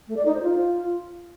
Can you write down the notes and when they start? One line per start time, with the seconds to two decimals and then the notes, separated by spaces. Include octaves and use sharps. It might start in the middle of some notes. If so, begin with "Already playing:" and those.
0.07 A3
0.16 D5
0.25 D#4
0.34 C5
0.43 F4